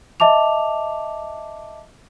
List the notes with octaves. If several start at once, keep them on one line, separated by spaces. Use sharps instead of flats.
D#5 E5 A5 D6 F7